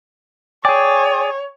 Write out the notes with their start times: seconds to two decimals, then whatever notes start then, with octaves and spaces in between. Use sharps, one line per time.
0.65 G#4 C#5 D5 G5 G#5